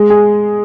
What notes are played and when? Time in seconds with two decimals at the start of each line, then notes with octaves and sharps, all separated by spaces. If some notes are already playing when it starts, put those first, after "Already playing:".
Already playing: G#3
0.10 G#4